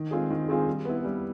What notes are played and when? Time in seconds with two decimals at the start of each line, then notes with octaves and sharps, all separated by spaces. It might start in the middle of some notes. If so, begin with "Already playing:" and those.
Already playing: D#3
0.11 G#3 C4 F4 G#4
0.30 D#3
0.48 G#3 C4 F4 G#4
0.67 G3
0.85 B3 E4
1.04 G3